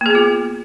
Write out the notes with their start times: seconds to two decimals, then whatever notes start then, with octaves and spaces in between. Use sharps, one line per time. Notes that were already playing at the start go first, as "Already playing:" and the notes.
0.01 A#3
0.06 G#4
0.10 B3
0.15 F4